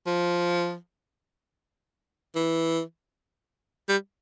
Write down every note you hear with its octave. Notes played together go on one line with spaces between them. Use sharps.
F3
E3
G3